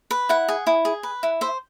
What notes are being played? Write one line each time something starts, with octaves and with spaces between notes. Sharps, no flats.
B4
E4 F#5
G#4
E4
G#4
B4
E4
C5 E5